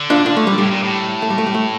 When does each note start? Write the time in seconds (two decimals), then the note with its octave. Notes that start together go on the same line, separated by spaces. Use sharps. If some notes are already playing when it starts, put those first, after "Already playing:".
Already playing: D3
0.10 D4 F4
0.26 D4 F4
0.37 A3
0.47 G3
0.58 A2 G3
0.71 A#2
0.83 A2
1.22 A3
1.30 G3
1.38 A3
1.47 G3
1.54 A3